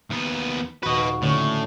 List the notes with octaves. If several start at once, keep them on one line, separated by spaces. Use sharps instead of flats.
D#2 B3
D#1 F#4 B4 D#5
A2 D3 C#4